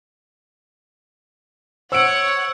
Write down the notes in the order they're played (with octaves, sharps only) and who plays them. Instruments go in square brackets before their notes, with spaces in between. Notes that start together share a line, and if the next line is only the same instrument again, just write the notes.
[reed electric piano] C5 [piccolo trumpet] C#5 [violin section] F#5 [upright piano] E6 D7